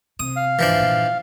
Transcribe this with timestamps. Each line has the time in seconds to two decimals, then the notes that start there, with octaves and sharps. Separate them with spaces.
0.20 C3 D#6
0.36 F5
0.59 D2 G#2 E3 F3 D4
0.76 G2 A#2